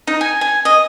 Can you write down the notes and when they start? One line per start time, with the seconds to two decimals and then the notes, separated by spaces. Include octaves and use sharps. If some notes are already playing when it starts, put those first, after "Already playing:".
0.07 D#4
0.21 G#5
0.41 G#5
0.65 D#5